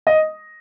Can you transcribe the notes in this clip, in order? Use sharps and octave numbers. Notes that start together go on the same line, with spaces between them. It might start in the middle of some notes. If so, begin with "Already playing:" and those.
D#5